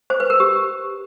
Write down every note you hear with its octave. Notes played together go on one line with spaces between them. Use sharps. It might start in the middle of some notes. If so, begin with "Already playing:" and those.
C5
B4
A#4
G4